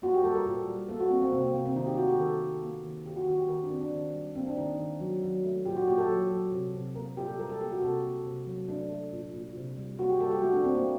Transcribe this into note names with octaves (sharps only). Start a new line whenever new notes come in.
A#3 F#4
G4
G3 A4
A#4
A#2
G3
A#3 A4
F#4
A#3 C4
C4
C3 C4
A#3
C3 A#3
C4
D#3 D#4
G4
A3 F#4
G4
D#3 A4
D#3
A#3
D#3
D#3 G4
F#4
D#3 F#4
G4
D#3 A#4
D4
D#3 C4
D4
D#3
G3
A#3 C4
D4
D#3 D#4
D#3
F#3
F#3
A3
A#2 G4
F#4
A#2 G4
A4
F#3
F#3
C3
C3
A#3 A#4
A#2 G4
A4
G3 A#4
A4
A#3 G4
F#4
C3 A4
A#3
C3
F#3
A3 D4
A3
A#2
A#2
C3
G3
A#3 F#4
G4
G3 A4
G4
A3 F#4
D4
A3 C4
A#3